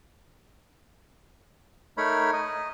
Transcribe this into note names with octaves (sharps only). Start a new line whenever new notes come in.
A3 D#4 A#4 C#5 B5
D#5